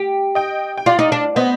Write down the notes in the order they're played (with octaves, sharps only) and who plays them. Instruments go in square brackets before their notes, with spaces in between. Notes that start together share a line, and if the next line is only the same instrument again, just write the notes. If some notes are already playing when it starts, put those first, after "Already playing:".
Already playing: [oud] G4
[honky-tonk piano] D#5 G5
G5
[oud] F4 [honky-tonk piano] D5 F5
[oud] D#4
D4
[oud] B3 [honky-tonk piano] C5 D#5